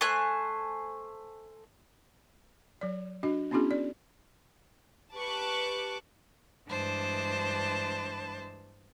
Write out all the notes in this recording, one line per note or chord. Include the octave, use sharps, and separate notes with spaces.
A3 C5 G#5 F#6
F#3 D5
D4 F#4 D#5
B3 C#4 D4 E4 F#4 G#4
D5
G4 B4 A5 C#6 D6 F#6
G2 E3 G#3 D4 C5 A5